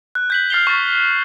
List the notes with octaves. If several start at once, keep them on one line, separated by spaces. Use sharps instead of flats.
F#6
G6 B6 F#7
F6 A6 C7 F7 G7
C#6 F6 A6